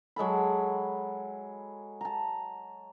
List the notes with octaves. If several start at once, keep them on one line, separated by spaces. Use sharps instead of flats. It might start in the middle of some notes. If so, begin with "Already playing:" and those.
F#3 G#3 A4 B5
A5 A#5